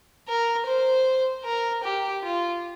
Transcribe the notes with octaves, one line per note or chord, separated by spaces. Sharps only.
A#4
C5
A#4
G4
F4